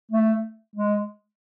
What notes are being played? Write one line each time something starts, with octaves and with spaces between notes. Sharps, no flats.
A3
G#3